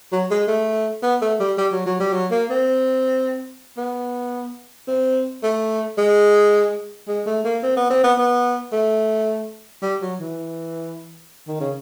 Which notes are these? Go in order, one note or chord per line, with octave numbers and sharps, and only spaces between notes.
F#3
G#3
A3
B3
A3
G3
G3
F#3
F#3
G3
F#3
A#3
C4
B3
C4
A3
G#3
G#3
A3
A#3
C4
B3
C4
B3
B3
A3
G3
F#3
E3
D#3
C#3